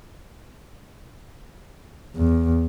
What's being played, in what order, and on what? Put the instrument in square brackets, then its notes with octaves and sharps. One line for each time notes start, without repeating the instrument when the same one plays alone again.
[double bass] E2